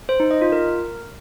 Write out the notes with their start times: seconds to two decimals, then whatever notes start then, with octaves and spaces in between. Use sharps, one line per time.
0.09 C5
0.20 D#4
0.31 D#5
0.41 F4
0.52 A#4